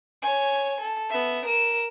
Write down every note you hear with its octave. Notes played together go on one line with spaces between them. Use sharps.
C#5 G#5
A4
B3 E5
A#4 E7